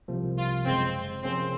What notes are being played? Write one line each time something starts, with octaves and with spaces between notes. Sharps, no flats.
C2 C3 F3 A#3
F4
G#1 F#2 C#3 G#3 C4
C3 F3 A#3 C4 C#4 G#4